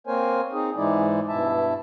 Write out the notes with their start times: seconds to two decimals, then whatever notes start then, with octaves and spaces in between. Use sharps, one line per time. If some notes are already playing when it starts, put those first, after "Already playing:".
0.07 A#3 C4 A#4 C5 C#5 G#5
0.52 C4 D#4 G#4
0.76 G#2 E3 G#3 D#4 E4 D5
1.29 G2 B2 E4 E5 A5